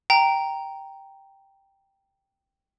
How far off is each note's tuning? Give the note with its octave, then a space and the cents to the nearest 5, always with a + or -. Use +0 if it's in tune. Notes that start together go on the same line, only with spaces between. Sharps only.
G5 +0 A#5 +0